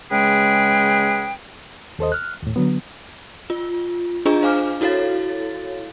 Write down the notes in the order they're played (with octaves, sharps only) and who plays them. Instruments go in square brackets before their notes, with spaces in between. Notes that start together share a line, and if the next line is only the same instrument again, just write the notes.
[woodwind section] C#3 G#3 G#4 B4 G5
[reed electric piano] D#2 A4 C5 D#5
F6 F#6
D#2 A2
D3 F#3 B3
[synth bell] F4
D4 F4 G#4 D#5 A#5
C5 F5 G#5 D6 F6
E4 F#4 A4 C#5 F5 A6